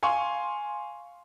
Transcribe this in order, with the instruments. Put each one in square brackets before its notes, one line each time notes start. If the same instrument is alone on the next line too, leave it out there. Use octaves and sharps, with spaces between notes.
[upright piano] F5 G#5 C6 C#6